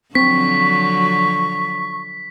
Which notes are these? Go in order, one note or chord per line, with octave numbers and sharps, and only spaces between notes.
D3 F3 F#3 C4 C#6 B6